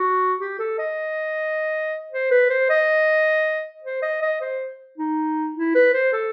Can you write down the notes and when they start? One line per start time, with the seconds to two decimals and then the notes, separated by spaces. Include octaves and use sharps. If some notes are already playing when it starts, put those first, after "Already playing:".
Already playing: F#4
0.41 G4
0.59 A4
0.78 D#5
2.12 C5
2.31 B4
2.50 C5
2.70 D#5
3.84 C5
4.03 D#5
4.22 D#5
4.41 C5
4.98 D#4
5.56 E4
5.75 B4
5.93 C5
6.13 A4